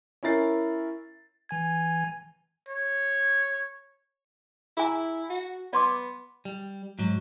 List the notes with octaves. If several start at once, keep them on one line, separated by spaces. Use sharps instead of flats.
C#4 E4 A#4 A6 C7
E3 G#5 G#6
C#5
E4 G#4 G#5 A#5
F#4
B3 D5 C6 D6
G3
G#2 F#3